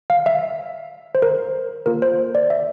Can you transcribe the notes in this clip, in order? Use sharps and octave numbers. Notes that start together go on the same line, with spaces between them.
F5
E5
C5
A#4
A#3 F4 A4 A#4
C5
D5
E5